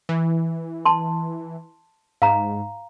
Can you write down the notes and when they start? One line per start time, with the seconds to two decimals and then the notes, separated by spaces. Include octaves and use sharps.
0.09 E3
0.85 A5 C6
2.22 G#2 F5 A#5